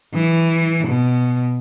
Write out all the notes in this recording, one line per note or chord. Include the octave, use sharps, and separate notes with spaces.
E3
B2